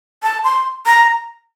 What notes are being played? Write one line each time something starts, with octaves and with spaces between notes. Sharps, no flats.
A5
C6
A#5